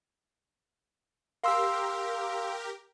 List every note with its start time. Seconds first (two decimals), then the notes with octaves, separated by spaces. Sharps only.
1.44 G4 A#4 F5 C6 E6